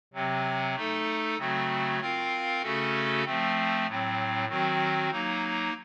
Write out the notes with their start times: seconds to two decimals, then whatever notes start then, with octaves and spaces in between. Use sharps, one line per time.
0.14 C3 F#3 C4
0.75 A3 D#4 A4
1.37 C#3 F#3 A3 C4 F#4
2.00 C4 F4 A#4 F5
2.62 C#3 A3 C#4 F#4 A4
3.25 F3 A3 C4
3.86 A2 F#3 C4
4.48 D#3 F#3 C4 F#4
5.11 F#3 A#3 D#4